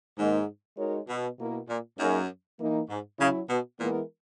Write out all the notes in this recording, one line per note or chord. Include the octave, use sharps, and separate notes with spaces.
G#2 D#3 A#3 D#4 A#4 D#5
G#3 D#4 F#4 A#4 C#5
B2
B2 A#3 E4 A#4
A#2
F#2 A#3 D#4 G#4
E3 A#3 D#4
G#2
C#3 F#3 C#4 E4
B2
A#2 E3 G#3 B3 E4 A#4